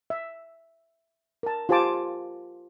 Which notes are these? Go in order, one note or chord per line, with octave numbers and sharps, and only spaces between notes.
E5
A#4 A5
F4 G4 C5 G#5 A5 D6